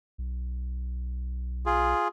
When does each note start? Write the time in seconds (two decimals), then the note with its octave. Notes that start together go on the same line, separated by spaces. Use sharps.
0.18 B1
1.66 F4 G#4